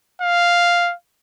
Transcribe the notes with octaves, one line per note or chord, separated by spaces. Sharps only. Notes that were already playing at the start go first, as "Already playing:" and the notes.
F5